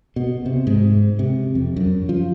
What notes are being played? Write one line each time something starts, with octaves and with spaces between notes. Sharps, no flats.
B2
C3
G#2
C3
F2
F#2
F3